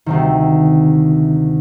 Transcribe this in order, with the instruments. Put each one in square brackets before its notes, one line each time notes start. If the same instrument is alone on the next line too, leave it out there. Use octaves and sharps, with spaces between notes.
[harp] D2 C3 D#3